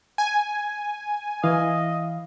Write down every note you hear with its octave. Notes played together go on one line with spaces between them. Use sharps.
G#5
E3 D#5 F5